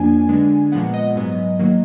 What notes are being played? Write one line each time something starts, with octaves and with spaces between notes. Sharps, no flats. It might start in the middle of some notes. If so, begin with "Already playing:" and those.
Already playing: F2 F3 A#3 D4 G#5
D3 G#3 B3 D4
A#2 F3 G#3 B3 F#5
D#5
G#2 F#3 B3
D#3 F#3 A#3